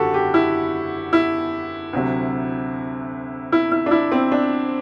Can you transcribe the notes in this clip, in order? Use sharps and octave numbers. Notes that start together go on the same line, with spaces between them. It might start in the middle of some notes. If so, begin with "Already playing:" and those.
Already playing: F#1 E2 D3 F#4 G4 A4
G4
E4
E4
D2 C3 F#3
E4
E4
D4
E4
C4
D4